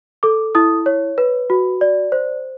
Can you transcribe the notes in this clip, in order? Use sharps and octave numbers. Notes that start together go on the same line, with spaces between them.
A4 D6
E4 D#6
C#5
B4
F#4
D5
C5